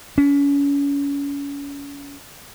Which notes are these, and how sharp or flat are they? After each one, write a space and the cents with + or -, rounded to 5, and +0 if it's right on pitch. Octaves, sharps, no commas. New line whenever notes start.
C#4 +35